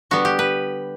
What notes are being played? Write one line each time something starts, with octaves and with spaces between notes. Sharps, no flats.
D3 G3 B3 F#4
G4
B4